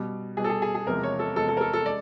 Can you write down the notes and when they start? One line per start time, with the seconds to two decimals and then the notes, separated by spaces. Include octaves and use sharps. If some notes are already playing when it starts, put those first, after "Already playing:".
Already playing: B2 G3
0.37 B2 G3 G#4
0.44 A4
0.50 G#4
0.62 G#4
0.75 G#4
0.87 E2 C3 F3 G#3 A#4
1.03 C#5
1.19 A4
1.36 E2 C3 F3 G#3 A4
1.48 A4
1.57 A#4
1.61 A4
1.73 A4
1.85 G#3 D5